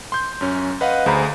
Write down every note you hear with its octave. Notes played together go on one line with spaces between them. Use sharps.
C6 G6
F#2 C#4
B4 D#5 F5 F#5
D2 G#4 C5 A#5 B5